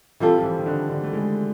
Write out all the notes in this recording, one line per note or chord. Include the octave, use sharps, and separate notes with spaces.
E3 G3 C4 F4 A4
F3
E3
D#3
D3
D3
A3
G#3